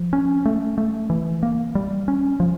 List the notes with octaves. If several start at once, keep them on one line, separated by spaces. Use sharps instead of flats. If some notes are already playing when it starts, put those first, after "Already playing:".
Already playing: F3
C#4
A3
A3
E3
A#3
G3
C#4
F3